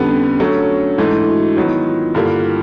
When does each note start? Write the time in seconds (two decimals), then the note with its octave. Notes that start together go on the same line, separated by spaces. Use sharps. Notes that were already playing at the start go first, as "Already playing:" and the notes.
Already playing: F2 D3 G3 B3 C#4 D4
0.11 C#4
0.39 F#3 A3 C#4 D4
0.98 G#2 E3 A3 E4
1.27 E4 F#4
1.56 D#3 F#3 B3 E4
1.86 F4
2.15 G2 D3 G3 A#3 F4
2.44 E4